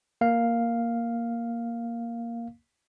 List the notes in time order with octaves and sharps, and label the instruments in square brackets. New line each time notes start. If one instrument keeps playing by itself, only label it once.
[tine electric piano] A#3 F5